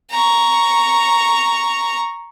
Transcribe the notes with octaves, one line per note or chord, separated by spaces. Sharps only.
A#5 C#6